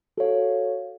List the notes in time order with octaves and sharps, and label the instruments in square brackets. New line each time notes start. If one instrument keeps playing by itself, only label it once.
[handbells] F#4 A4 C#5 F5